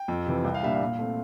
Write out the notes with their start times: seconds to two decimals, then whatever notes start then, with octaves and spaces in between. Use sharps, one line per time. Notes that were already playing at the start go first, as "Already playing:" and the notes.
Already playing: G5
0.08 F2
0.26 C3 E3
0.44 C2 G5
0.54 F5
0.62 A#2 G3 D4 E5
0.73 F5
0.81 A#2
0.99 A3 C4